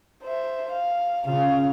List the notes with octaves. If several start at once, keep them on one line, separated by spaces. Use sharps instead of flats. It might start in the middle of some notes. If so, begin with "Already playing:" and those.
C5 E5
F5
C#3 F4 F5